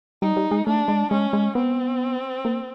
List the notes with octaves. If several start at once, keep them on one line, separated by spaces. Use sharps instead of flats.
G3 D#4
G3
G#3
A3 D4
G#3
G#3 C#4
G#3
B3 C4
A#3